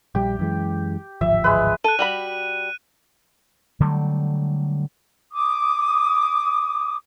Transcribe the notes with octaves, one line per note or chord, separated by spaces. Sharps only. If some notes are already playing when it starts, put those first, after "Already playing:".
A#1 G3 G4
F#2 E3 G#3
D1 G#1 F3 E5
G#3 B4
A4 F#6 D#7
G3 F#4 B5
D3 F#3 G3 A3
D6 D#6